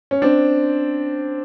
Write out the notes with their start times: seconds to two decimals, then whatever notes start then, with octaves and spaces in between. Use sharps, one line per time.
0.11 C#4
0.22 C4 D4